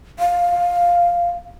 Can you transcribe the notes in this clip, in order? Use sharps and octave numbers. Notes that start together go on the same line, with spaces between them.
F5